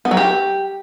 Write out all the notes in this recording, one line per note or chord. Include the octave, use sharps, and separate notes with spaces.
B3
F#3
G4